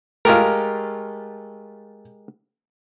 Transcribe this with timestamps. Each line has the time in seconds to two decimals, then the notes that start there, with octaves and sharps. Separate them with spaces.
0.25 G#3 A3 F4 G4 A#4